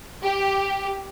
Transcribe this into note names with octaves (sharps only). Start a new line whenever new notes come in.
G4